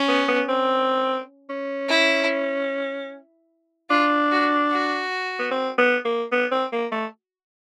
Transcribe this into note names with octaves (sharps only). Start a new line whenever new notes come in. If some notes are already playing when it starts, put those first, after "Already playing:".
Already playing: C#4
B3
B3
C4
C#4
E4
D4 F4
F#4
F#4
B3
C4
B3
A#3
B3
C4
A#3
A3